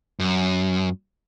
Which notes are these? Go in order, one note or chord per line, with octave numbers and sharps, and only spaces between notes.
F#2